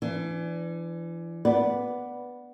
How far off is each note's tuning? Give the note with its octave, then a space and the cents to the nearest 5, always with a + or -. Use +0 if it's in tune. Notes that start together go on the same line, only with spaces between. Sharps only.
E3 +30 D4 +0
B3 +0 B4 -10 D5 +0